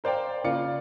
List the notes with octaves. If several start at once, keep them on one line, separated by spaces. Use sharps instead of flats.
A#4 C5 D5 F5 G5
C#3 A#3 F4 D5 C#7